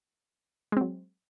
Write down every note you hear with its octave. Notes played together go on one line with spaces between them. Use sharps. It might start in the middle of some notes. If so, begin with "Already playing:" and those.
F#3 G#3 C4